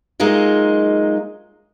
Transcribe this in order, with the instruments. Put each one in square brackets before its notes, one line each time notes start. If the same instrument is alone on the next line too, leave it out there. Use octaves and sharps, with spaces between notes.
[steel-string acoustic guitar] F#3 G#3 A#3 D#4 F4